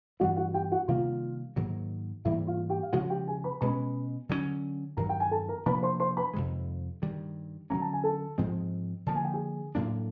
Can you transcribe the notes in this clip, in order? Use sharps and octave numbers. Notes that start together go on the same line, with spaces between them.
G2 E3 G3 B3 F#4 F#5
F#4 F#5
G4 G5
F#4 F#5
C3 D#3 G3 A#3 F4 F5
G#2 D#3 F#3 A#3
G#2 E3 G3 A#3 E4 E5
F4 F5
G4 G5
F5
C#3 F3 G#3 F#4 F#5
G4 G5
G#4 G#5
B4 B5
B2 G#3 C#4 B4 B5
D3 F#3 A3 C#4
G2 D#3 F#3 A#4 A#5
G5
G#5
A4 A5
A#4 A#5
C3 F3 A#3 D4 B4 B5
C5 C6
C5 C6
B4 B5
F2 C3 D#3 G#3
G2 D#3 G3
D3 F#3 A#3 C#4 A#5
A5
G#5
A4 A5
G#2 F3 G#3 C4
D3 F3 A#3 A5
G#5
G5
G#4 G#5
A2 F#3 A#3 D4